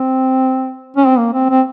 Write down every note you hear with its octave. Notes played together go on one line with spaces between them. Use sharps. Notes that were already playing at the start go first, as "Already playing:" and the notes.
Already playing: C4
C#4
C4
A#3
C4
C4